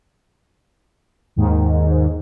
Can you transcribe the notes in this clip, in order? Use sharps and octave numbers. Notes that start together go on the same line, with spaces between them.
D#2 G#2 D#3